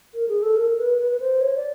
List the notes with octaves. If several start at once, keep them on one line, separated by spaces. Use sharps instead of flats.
A#4
G#4
A4
A#4
B4
B4
B4
C5
C#5
D5